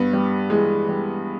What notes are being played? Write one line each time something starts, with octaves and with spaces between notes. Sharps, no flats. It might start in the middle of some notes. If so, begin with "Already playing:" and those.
Already playing: G2 B3
G3
E3 G#3
G3